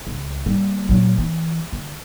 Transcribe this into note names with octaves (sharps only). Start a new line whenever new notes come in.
C#2
G3 A#3
A#2 F#3
E3
D3